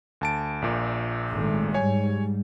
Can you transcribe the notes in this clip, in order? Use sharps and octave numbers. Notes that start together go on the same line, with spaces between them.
D2 A5 D7
A#1 A#2
G#1 A3
G#2 G3 C#5 G#5